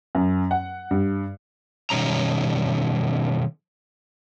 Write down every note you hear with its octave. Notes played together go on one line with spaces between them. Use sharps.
F#2
F#5
G2
B2 D#3 G3 C#4 A#5